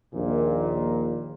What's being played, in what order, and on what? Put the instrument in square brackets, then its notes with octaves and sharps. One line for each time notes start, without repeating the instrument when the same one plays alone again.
[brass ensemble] A#1 D#2 A#2